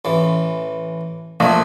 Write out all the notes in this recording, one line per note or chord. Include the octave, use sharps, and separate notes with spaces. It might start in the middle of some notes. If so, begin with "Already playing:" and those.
A1 E3
A#1 F3 A3